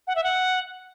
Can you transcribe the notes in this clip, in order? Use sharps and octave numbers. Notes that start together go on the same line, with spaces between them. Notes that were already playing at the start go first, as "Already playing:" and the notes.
F#5
E5
F#5